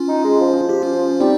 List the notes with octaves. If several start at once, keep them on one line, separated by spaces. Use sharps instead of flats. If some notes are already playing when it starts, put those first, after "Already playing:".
Already playing: C#4 F4
D#4
G#3
F3
F4
G4
C#4 F4
G3 C4 D#4